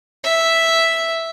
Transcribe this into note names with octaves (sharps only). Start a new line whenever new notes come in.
E5